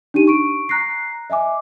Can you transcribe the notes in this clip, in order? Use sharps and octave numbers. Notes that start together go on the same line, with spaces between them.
D4 D#4 G4 D#7
C#6 D7
A#5 F#6 A#6 C7
D#5 E5 G#5 D6